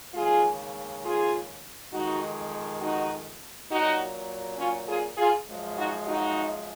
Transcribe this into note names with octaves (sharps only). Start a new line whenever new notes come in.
D#2 C#3 G#3 F4 G#4
F4 G#4
F2 D#3 G#3 D#4 F#4
D#4 F#4
A#2 F#3 D#4 F#4
C#4 F4
F4 G#4
F4 G#4
F#2 F3 G#3
D#4 F#4
D#4 F#4